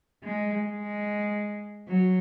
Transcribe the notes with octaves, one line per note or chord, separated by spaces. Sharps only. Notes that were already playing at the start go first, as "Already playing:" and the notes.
G#3
G#3
F#3